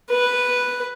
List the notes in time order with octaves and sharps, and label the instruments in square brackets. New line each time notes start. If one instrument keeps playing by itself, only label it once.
[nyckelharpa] B4